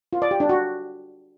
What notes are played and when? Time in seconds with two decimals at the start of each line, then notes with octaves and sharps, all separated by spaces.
0.13 F4
0.22 D5
0.31 G4
0.40 D4
0.49 F#4